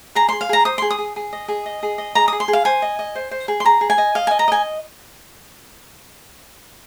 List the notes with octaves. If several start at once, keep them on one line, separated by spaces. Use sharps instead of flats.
G#4 A#5
G#4 C6
F5
G#4 A#5
C5 D#6
G#4 C6
D#6
G#4
G#4
D#5
G#4
D#5
G#4
D#5
G#4 A#5
G#4 D#6
C6
G#4
F5
C5 G#5
D#5
D#5
C5
C5
G#4
C6
G#4 A#5
G#4
G#5
D#5
D#5 F5
D#5 G#5
A#5
D#5 G#5